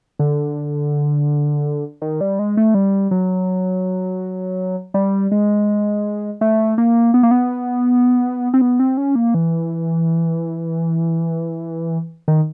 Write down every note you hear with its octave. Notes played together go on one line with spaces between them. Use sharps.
D3
D#3
G3
G#3
A3
G3
F#3
G3
G#3
A3
A#3
B3
A#3
B3
C4
B3
C4
C#4
A#3
E3
D#3